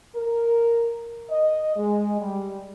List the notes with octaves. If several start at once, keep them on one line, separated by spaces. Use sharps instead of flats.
A#4
D#5
G#3
G3